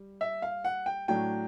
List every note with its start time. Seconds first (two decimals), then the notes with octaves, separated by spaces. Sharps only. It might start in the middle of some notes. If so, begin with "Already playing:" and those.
Already playing: G3
0.21 E5
0.42 F5
0.64 F#5
0.86 G5
1.08 A2 F#3 A3 D4 G5